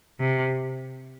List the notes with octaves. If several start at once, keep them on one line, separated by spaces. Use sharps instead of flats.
C3